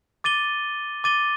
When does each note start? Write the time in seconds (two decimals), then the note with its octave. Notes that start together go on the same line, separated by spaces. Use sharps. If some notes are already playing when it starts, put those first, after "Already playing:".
0.24 D6 A6 D#7 G7
1.04 D6 A6 D#7 G7